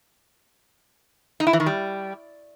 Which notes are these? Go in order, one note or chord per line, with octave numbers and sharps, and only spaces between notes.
D#4
E4
E3
D#3
G3